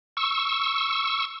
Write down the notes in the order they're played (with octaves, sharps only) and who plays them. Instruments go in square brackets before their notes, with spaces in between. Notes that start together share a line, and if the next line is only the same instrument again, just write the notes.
[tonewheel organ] C#6 E6